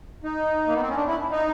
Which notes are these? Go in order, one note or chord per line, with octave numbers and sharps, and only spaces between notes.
D#4
A#3
B3
C4
C#4
D4
E4
D#4